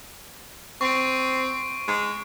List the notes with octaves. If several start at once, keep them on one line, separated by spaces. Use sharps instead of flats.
C4 C#6 D7
G#3